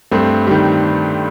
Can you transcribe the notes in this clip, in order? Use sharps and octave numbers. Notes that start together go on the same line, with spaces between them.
G2 A3 C4
D#3 G3